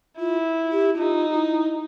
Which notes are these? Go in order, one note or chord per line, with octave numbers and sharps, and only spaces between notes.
E4 F4
G4
E4
D#4 F4
F4
E4